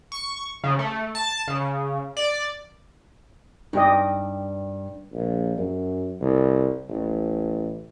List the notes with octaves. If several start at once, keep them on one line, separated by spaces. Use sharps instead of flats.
C#6
C#3
A3
A5
C#3
D5
G2 D#4 G4 D#5
A#1
F#2
C2
A1